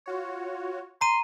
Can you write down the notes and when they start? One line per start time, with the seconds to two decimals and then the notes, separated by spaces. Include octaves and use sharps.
0.06 F4 F#4 C#5
1.01 A#5 C6 D#7